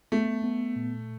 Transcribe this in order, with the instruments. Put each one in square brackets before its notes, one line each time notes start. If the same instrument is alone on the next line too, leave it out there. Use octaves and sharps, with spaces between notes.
[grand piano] A3 [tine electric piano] B3
[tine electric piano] B3
A#2